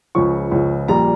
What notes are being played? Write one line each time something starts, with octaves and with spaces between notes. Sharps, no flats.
C#2 C#3 F3 C#6
C#2 C#3 F3
A#1 A#2 G3 A#5